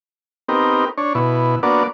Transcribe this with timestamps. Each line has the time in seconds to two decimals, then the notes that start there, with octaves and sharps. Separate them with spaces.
0.49 B3 C4 D#4 G4 A#4
0.98 D4 C#5
1.15 B2 E4
1.63 A#3 B3 D4 F#4 D5